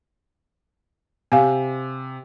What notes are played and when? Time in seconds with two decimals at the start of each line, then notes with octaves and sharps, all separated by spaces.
1.32 C3 F5 G#5